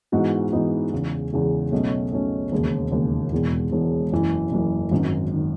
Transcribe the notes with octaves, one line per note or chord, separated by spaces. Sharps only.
G#2 E3 B3 D#4 F#4
G#2 E3 B3 D#4 F#4
E2 C#3 G#3
E2 C#3 G#3
B1 B2 A3 C#4
B1 B2 A3 C#4
E1 D#2 C#3
E1 D#2 C#3
E1 E2 B2 G#3
E1 E2 B2 G#3
F#1 F#2 E3
F#1 F#2 E3
G#1 F#2 D#3
D#3